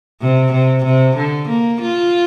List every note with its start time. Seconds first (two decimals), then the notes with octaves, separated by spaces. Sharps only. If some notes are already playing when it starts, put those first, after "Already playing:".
0.21 C3
0.52 C3
0.84 C3
1.16 D3
1.49 A#3
1.81 F4